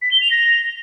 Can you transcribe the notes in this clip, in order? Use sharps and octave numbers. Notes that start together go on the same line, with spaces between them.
B6
G7
F7
A#6